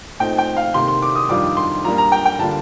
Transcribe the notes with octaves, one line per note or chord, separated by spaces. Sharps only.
A#2 A3 C4 D#4 G5
G5
F5
C3 D#3 A#3 C6
C6
D6
D#6
F2 D#3 G3 D4 F4 D6
C6
A#2 G3 A#3 D4 F4 A#5
A#5
G5
G5
D3 G3 A#3 F4 A5